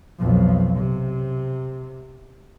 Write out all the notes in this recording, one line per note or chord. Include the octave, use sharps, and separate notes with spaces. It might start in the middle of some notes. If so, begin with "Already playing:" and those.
B1 F2
C3